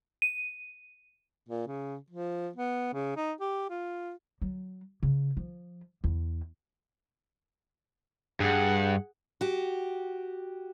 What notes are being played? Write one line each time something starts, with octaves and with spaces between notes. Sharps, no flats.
D#7
A#2
C#3
F3
B3
C#3
D#4
G4
F4
F#3
C#3
F3
E2
G2 G#4 F#5
F#4 G4